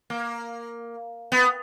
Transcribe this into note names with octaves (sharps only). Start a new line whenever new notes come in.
A#3
B3